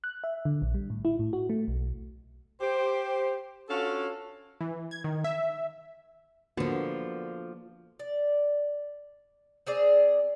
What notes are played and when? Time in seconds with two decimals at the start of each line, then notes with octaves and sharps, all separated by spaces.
0.04 F#6
0.24 E5
0.45 D3
0.62 A#1
0.75 G3
0.90 A2
1.05 E4
1.19 A2
1.33 F#4
1.50 A3
1.68 B1
2.61 G4 C5
3.70 C#4 D4 F4 F#4 A4 F5
4.61 E3
4.91 G#6
5.04 D#3
5.24 E5
6.57 D3 F3 A#3 B3 F#4
7.99 D5
9.67 C4 G#4 D5